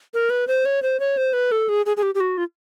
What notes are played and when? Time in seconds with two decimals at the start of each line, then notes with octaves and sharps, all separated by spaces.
0.14 A#4
0.30 B4
0.48 C5
0.65 C#5
0.82 C5
1.00 C#5
1.17 C5
1.33 B4
1.52 A4
1.69 G#4
1.86 G#4
1.97 G#4
2.03 G4
2.15 G4
2.20 F#4
2.38 F4